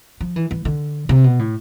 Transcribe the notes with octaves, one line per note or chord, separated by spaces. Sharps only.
F3
E3
E3
D3
C3
B2
A2